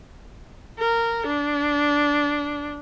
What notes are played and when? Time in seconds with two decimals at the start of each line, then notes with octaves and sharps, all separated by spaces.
0.79 A#4
1.27 D4